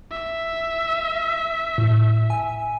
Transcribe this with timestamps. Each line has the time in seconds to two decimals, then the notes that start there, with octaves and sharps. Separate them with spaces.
0.12 E5
1.78 A2
2.30 G#5